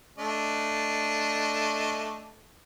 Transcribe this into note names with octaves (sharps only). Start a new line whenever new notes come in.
A3 D4 D#5